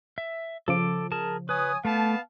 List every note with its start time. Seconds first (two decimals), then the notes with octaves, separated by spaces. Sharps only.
0.18 E5
0.68 C#3 F3 A4 D6
1.12 G#4 A#4 A5
1.49 B4 C#5 G#5 D#6
1.85 A3 B3 F5 A5